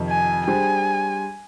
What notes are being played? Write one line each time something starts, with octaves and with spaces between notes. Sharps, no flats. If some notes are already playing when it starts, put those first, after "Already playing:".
Already playing: F2 C3 D#3
G#5
G3 D4 G#4 C5 G#5